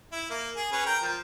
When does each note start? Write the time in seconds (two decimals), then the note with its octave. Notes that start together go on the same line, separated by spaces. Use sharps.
0.12 E4
0.30 A#3
0.56 G#4
0.72 C#4 G#4 B4
0.86 A#4 G5 A#5
1.02 F3